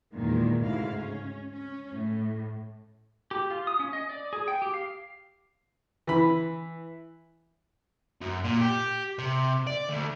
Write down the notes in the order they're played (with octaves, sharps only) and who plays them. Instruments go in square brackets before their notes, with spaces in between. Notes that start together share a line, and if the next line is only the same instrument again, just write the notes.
[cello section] E2 A#2 D#3 G#3
D2 G#2 C#3 E4 F5
C#4
C#4
A2
[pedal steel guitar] G4
F4
D#6
C#4
D#5
D5
G#4
G5
G4
F5
[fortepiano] E3 B5
[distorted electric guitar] F#2
A#2
G4
C3
D5
D2